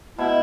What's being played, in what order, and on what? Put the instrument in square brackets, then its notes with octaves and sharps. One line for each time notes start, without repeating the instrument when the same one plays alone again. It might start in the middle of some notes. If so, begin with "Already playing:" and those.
[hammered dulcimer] B2 [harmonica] E4